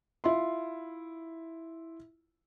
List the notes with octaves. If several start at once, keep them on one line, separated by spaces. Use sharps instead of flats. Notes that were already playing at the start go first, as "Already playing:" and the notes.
E4 F4 C6